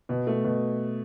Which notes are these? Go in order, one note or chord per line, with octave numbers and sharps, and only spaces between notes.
B2
A3
B2